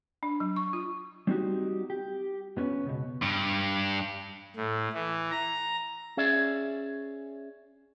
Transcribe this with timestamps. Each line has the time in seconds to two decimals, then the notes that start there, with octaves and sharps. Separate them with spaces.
0.23 D4
0.40 F#3
0.56 C#6
0.73 F4
1.27 G3 C4 D#4 F#4 G4
1.90 G4
2.57 F2 B3 C#4
2.86 C#2 B2
3.22 G2
4.56 A2
4.93 E3
5.31 A#5
6.17 C#4 G#4 D5 E5